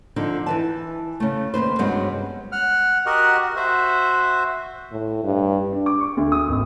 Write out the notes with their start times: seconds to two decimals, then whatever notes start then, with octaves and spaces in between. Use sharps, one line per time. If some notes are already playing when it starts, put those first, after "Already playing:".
0.16 D3 F3 D#4
0.46 E3 B4 A5
1.20 C#3 A3
1.54 D#2 B2 B4 C5
1.79 G2 C3 F#3 G#3 B3 C#4
2.52 F#5 F6
3.06 F#4 G4 A#4 D#5 F#5
3.56 F#4 C5 E5
4.91 A2
5.24 G2
5.73 D4
5.86 D6
6.00 C#6
6.17 D2
6.32 D#6
6.49 G#1